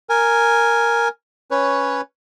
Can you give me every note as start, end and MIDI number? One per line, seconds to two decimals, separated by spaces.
0.09 1.08 70
0.09 1.08 80
1.51 2.01 61
1.51 2.01 71
1.51 2.01 73